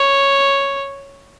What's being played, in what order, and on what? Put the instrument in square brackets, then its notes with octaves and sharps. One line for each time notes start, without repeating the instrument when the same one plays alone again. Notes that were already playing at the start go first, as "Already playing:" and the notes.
Already playing: [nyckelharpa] C#5